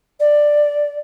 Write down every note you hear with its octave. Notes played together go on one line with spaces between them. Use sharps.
D5